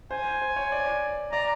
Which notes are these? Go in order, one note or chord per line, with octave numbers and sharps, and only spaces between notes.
C5 G#5
C5
C#5
D5
D5 A#5